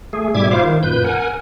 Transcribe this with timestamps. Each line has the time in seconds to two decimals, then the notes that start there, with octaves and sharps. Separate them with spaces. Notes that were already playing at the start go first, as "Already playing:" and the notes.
0.13 A3 G#4
0.34 G#2 B2 G3 E5 D6 G#6
0.51 E4 F4 C5 F5 D6
0.64 D#3
0.83 F#2 A#2 B4 G6
1.04 A#4 F#5 G#5